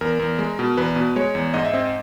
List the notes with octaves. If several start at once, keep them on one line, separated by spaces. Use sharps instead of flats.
E2 A#4
E2
G#3
B2
E2 B4
B2
G#3 C#5
E2
G#2 D#5
E5
C4 D#5